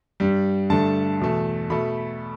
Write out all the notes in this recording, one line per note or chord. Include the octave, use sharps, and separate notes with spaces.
G2 G3
G2 D3 A3 A5
E2 B2 A3
B2 A3 B5